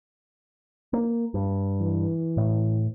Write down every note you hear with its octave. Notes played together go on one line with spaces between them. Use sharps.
A#3
G2
E3
A2